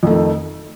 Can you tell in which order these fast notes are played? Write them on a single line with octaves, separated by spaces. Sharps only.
F2 A3 D#3